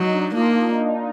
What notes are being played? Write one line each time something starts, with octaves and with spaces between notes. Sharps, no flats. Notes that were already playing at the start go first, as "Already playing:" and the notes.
Already playing: F#3 D#4
D4
A#3 F4